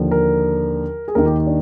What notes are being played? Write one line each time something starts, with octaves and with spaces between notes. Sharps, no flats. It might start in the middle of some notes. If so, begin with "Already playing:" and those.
Already playing: D#2 D3 F3
A#4
G#4
D#2 D#3 A#4
G4
D4